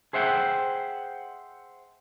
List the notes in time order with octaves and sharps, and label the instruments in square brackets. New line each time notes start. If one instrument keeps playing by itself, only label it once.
[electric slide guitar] G#4 C5 E5 F#5 G5